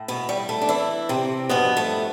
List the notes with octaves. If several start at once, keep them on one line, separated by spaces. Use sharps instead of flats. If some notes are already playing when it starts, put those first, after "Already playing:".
Already playing: A2
B2 B3
G3
A3
D4
E3 E4
C3 C4
G2 B2 F3 B3
A3